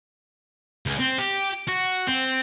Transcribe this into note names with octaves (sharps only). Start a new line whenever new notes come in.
C#2
C4
G4
F#4
C4